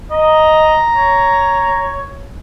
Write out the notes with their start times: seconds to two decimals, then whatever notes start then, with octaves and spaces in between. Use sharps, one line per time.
0.11 D#5 A#5
0.95 C#5